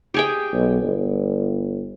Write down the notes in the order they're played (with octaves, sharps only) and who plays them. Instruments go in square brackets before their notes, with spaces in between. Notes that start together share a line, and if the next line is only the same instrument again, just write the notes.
[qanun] G4 G#4 G5
[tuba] B1
G1